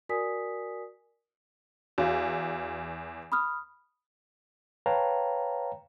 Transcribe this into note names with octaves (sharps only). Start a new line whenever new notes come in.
F#4 A#4 D5 G#5 D#6 B6
E2 F#4 F5
B5 D#6 F6
B4 C#5 F5 G5 A5 A#5